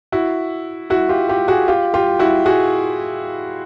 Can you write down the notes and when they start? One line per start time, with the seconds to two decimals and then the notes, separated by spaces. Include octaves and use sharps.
0.12 E4 F#4
0.90 E4 F#4
1.09 F4 G4
1.29 F4 G4
1.48 F#4 G#4
1.68 F4 G4
1.94 F4 G4
2.19 E4 F#4
2.46 F#4 G#4